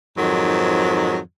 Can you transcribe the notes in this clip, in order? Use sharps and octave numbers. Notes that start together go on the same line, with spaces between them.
F2 G#2 D#3 F#3